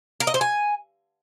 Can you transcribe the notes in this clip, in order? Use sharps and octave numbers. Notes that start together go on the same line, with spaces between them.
A#4
D#5
C5
G#5